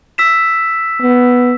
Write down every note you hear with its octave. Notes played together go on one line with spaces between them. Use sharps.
E6 B6 E7
B3